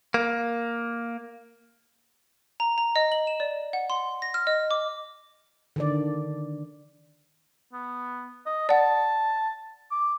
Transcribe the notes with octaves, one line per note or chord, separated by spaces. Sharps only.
A#3
A#5
A#5
D#5
F#7
E7
D5
F#5
C6
A#6
F6
D#5
D6
D3 D#3 D5
B3
D#5
D5 F#5 A5
D6